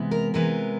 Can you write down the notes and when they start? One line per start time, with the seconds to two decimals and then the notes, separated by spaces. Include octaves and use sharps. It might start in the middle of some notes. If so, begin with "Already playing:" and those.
Already playing: C3 E3 G#3 B3
0.11 A#4
0.34 C3 E3 G#3 B3 A#4